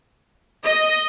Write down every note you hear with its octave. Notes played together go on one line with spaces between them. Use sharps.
D#5